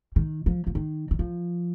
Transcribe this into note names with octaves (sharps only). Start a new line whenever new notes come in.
D#3
F3
F3
D#3
D#3
F3